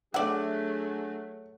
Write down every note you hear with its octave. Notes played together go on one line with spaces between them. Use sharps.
F#3 A3 D4 G#4 D5 E5 F#5